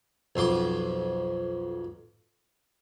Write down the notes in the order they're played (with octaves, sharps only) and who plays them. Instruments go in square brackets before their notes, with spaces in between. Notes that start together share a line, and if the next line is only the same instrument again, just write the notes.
[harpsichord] B1 F2 C6 D6